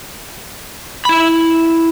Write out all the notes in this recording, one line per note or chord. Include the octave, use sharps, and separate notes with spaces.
E4 B5